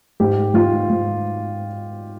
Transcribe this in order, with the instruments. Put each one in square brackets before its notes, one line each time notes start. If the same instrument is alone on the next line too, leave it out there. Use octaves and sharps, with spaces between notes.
[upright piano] G#2 G4
G#2 F4
G#2